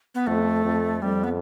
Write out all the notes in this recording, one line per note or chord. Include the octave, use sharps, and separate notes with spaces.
B3
F2 A3
F2
F2 G3
B3